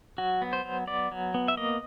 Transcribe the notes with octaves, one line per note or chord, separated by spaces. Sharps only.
F#3 F#4
B3
C5
F#3
B3 D5
F#3
B3
E5
A#3 D#5